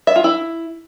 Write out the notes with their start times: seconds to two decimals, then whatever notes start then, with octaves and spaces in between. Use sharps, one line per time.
0.07 E5
0.16 F4
0.24 E4